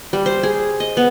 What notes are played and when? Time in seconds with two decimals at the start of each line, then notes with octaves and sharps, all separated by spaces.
0.13 G3
0.26 C5
0.43 G#4
0.80 D#5
0.97 B3